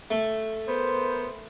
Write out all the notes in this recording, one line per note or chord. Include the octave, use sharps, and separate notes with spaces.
A3
B3 A#4 C5